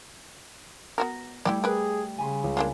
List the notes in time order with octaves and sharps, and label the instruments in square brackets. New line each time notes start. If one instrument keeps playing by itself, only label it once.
[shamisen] B3 F#4 A#4 [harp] A#6
[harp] G3 A3 [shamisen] E4 G4 D5
[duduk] G#4 [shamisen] A#4 B4
[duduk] C#3 [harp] G#5 B5 C6
[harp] C#2
[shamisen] A#3 D4 F4